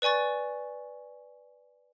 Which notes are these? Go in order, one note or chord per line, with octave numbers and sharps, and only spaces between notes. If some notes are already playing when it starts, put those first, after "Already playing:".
B4 D5 G#5 C#6 A6